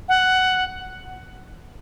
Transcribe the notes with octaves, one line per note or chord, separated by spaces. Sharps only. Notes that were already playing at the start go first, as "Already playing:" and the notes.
F#5